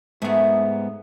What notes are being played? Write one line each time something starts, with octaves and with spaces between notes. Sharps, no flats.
G#2 A3 B3 G#4